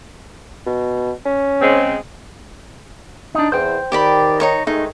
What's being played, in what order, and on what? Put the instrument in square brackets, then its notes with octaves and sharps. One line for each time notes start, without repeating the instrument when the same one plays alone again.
[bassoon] B2
C#4
[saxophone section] C#3 G#3 C4
[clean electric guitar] D4 D#4
[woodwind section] E2 [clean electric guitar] C5 G5
[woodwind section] D#3 [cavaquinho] G4 D5 B5
[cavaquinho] D#4 C#5 A#5
[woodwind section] D#3 G#3 A3 [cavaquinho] D#4